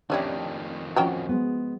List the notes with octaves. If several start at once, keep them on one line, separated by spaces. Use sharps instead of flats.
F2 D#3 G3 C#4 D4 E4 G4
F3 C#4 F#4 G5 A#5
G#3 B3